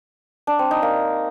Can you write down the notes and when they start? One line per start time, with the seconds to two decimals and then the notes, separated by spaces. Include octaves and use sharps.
0.47 D4
0.59 C4
0.71 D#4
0.83 A#3